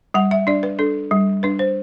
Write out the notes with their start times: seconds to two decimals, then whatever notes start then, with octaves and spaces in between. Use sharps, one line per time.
0.14 G3 F#5
0.31 E5
0.47 D4 D5
0.63 B4
0.79 D4 A4
1.11 G3
1.43 D4 B4
1.59 C5